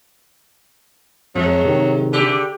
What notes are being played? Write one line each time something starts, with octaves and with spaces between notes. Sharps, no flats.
F2 F#3 G#3
C3 D#3
D3 G4